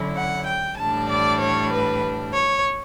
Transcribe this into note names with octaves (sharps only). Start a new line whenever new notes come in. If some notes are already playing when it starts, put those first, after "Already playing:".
Already playing: D3 F#3 C#4 E4
F#5
G5
A2 E3 G3 D4 A5
D5
C#5
B4
C#5